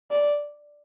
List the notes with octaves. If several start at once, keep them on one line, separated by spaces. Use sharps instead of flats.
D5